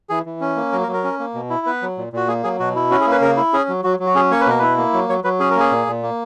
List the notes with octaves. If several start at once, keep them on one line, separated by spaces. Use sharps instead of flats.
E3 G#4
E3
C#4
A#3
F#3 A#4
A#4
F#3
A#4
C#4
A#3
B2
E4
B3 B4
F#3
A#2
A#2 F#4
A#3 G#4
F#3 G#4
B2 F#4
E4
C#4 F#4
G#4
A#3
B4
C#3 A#4
E4
C#4 G#4
F#3
F#3 F#4
F#3
F#4
C#4 G#4
A#3 C#5
B4
B2 A#4
E4 B4
A#3
F#3
F#3 C#5
F#3 B4
C#4 G#4
A#4
A#3 G#4
A#2
A#2
A#3